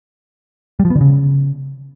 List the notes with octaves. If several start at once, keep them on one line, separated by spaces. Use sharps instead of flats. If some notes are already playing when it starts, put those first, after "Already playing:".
G3
F3
B3
D3
C#3